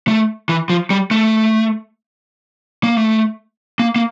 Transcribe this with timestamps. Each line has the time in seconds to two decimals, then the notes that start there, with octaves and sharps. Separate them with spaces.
0.08 A3
0.49 E3
0.70 F3
0.90 G3
1.11 A3
2.84 A#3
2.97 A3
3.79 A#3
3.96 A#3